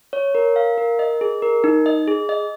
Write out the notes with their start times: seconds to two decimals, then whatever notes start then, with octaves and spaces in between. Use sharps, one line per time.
0.13 C#5
0.35 A#4
0.56 F5
0.78 A#4
0.99 D#5
1.21 G#4
1.42 A#4
1.64 D#4
1.86 D#5
2.07 G#4
2.29 D#5